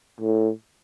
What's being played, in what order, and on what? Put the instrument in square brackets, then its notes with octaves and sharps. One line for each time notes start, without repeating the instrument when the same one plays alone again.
[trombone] A2